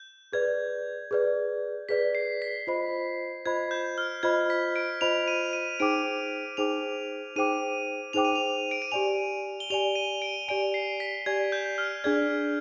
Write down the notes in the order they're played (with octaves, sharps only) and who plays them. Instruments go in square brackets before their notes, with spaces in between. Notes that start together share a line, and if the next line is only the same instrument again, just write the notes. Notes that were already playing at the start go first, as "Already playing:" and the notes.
Already playing: [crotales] G6
[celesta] G#4 B4 D5 [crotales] G#6
[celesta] G#4 B4 D5
[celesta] G#4 B4 D5 [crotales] B6
[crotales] C7
B6
[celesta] F4 C5 D#5 B5
[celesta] F4 C5 D#5 B5 [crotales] G#6
[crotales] G6
F6
[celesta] F4 C5 D#5 B5 [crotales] G#6
[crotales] B6
D7
[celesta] F4 C5 D#5 B5 [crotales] F7
[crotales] D#7
D#7
[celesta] D#4 G#4 C5 G5 D6 [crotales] D7
[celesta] D#4 G#4 C5 G5 D6 [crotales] F7
[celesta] D#4 G#4 C5 G5 D6 [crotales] D#7
[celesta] D#4 G#4 C5 G5 D6 [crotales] F7
[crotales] D#7
F7
D7
D#7
[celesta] G4 D5 G#5 [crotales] F7
[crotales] G7
[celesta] G4 D5 G#5 [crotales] F7
[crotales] D#7
D7
[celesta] G4 D5 G#5 [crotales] D7
[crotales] C7
B6
[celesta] G4 D5 G#5 [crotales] G#6
[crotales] G6
F6
[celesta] D4 G#4 D5 [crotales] G#6